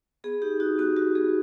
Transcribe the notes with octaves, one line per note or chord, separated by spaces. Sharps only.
B3 G#4
D#4 G4
D#4 F#4
B3 F#4
F#4
B3 G#4